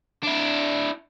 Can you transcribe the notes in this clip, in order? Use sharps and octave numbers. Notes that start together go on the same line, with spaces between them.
D4 E4